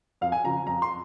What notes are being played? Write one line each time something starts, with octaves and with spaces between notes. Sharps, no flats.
F2 F5
G#5
C#3 F3 A#5
F2 A#5
C6